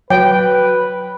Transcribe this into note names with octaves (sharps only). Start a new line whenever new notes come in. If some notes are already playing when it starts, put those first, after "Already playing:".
F#3 B4 G5